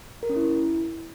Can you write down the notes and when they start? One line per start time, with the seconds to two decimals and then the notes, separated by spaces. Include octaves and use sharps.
0.23 A#4
0.30 C#4
0.36 E4